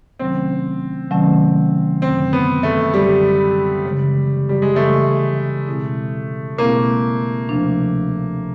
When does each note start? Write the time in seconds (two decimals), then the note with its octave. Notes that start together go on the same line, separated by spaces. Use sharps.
0.19 C3 D#3 F#3 A3 C4 C#4
1.11 C3 D#3 F#3 A3 C#4
2.02 F#2 D3 F#3 C4
2.33 B3
2.63 A3
2.93 F#2 D3 F#3 G3
3.84 C#3 E3 G#3
4.49 G3
4.62 G#3
4.75 C#3 E3 G#3 A3
5.67 B2 G#3 C4 E4 G#4
6.57 B2 G#3 A#3 C4 E4 G#4
7.49 D2 C3 F3 A3 D4